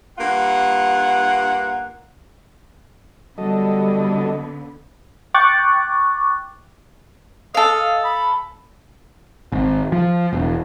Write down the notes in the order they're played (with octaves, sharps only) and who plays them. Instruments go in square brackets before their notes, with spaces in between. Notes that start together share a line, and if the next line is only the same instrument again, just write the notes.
[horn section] G2 A#3 F4 F#5
[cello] D3 B3 [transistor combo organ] F#3 A4 D#5 [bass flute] G3
[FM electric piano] G5 C#6 D6 F#6 A6
[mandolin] A4 F5 [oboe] D#5
[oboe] B5
[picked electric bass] G#1
F3
E1